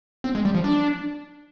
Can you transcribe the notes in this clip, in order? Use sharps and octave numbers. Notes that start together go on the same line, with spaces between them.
C4
G#3
G3
F3
D4